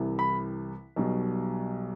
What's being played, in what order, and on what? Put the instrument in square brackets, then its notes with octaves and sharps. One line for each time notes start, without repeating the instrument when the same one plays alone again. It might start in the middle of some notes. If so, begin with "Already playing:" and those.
Already playing: [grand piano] C2 C3 E3
B5
B1 B2 G3